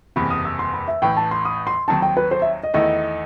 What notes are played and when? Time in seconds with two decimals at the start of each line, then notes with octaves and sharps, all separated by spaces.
0.16 F#1 E2 C3 E3 B5
0.30 D#6
0.45 E6
0.59 C6
0.73 B5
0.88 E5
1.02 A1 A2 E3 G5
1.17 A5
1.31 C6
1.45 D#6
1.67 C6
1.88 D#2 D#3 F#3 C4 D#4 A5
2.02 G5
2.17 B4
2.31 C5
2.42 E5
2.63 D#5
2.74 E2 D#3 A3 E4 D#5